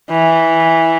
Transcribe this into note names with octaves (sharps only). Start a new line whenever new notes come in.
E3